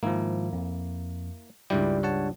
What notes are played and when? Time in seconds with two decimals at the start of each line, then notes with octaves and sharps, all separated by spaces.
0.03 G#2 D#3 F3 A#3 E4
0.53 F2
1.70 C#2 G2 G3 E4 D5 G5
2.03 C#5 F#5 A5